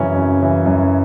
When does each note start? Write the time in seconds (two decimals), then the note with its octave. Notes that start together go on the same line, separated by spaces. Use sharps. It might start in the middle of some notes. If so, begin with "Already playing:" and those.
Already playing: F#2 C#3 E3 C#4
0.15 F#2
0.41 C#3 E3
0.66 F#2